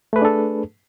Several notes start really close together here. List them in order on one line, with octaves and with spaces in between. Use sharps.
A3 B4 G#4 D4 A4